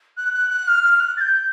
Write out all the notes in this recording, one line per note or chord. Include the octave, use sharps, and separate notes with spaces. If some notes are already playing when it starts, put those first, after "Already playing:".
F#6
F#6
F#6
F6
F6
F#6
A6
G6